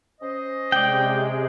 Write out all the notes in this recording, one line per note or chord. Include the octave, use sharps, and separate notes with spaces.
C#4 C5 D#5
C3 G#3 D5 G5